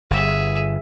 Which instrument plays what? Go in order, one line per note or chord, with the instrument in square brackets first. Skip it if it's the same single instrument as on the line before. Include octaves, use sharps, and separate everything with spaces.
[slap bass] G1 [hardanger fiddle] G#4 E5